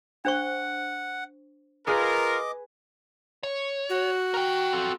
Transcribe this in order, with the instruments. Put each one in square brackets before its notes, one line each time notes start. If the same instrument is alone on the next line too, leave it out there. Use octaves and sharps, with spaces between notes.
[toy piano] D4 C5 C#6 [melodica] F#5
[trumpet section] F4 A#4 [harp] G#4 B4 [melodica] D#5 D6
[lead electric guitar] C#5
[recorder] F#4
[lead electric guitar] A#4 G5
C4 A4